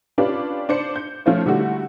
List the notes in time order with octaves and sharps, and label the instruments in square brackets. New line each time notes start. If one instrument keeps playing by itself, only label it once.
[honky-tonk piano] C#4 D4 F4 G4 B4
D4 C5 C#7
G6
F3 A3 C#4 F4 C5
D3 G3 A3 E4 F#4